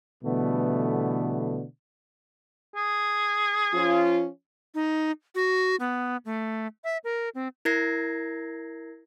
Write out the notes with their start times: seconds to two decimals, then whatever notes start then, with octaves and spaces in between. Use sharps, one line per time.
0.24 B2 D3 E3 G3 A3 B3
2.76 G#4
3.74 F3 C#4 F4
4.75 D#4
5.35 F#4
5.80 B3
6.25 A3
6.84 E5
7.04 A#4
7.35 C4
7.65 E4 A#4 G#6 A#6 C7